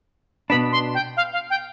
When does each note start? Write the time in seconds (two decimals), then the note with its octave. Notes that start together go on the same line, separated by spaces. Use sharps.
0.50 B2 B3 D4 B5
0.72 C6
0.94 G5
1.17 F5
1.33 F5
1.50 G5